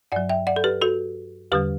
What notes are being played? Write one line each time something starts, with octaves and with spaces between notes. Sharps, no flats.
G2 F#3 D5 F#5
E5 G5
D5 F#5
A4
G4 B4
F#4 A4
E2 D3 G3 G4 B4